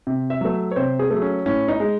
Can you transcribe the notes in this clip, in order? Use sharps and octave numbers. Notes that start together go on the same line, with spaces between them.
C3
E5
F#3 A3
C#5
C3 C5
G#4
F#3 A3
C#4
A2 C#4
D#4
G#3